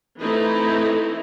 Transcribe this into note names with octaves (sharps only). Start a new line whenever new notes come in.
E3 A3 C4 D#4 E4